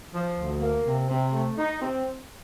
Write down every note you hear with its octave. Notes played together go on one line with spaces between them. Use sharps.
F3
D2
A#3
C3
C3
A3
D#4
C4